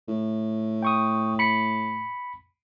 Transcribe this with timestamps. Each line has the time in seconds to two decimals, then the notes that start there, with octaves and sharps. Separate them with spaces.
0.08 A2
0.82 G5 C#6 D#6
1.39 B5 C#7